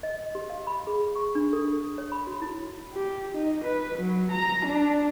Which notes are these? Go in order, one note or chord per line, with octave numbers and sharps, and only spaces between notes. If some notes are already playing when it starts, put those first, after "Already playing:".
D#5
G4
F5
B5
G#4
C#6
D4
A4
C#5
B5
F#4
E4
G4
D#4
B4
F#3
A#5
D4